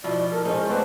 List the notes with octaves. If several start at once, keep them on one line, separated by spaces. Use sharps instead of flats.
B2 F3 E4 D5
A4 A#4
G#3 C#4 D#4 C5
A3 B3 C4 D4